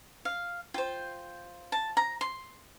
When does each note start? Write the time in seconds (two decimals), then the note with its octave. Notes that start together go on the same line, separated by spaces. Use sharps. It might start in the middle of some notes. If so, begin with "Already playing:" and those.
0.25 F5
0.74 F4 C5 G5
1.72 A5
1.97 A#5
2.21 C6